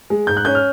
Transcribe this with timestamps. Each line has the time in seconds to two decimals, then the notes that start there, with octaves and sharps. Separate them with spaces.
0.10 G#3
0.27 G#2 G6
0.37 F#6
0.45 C#4 G6
0.55 F6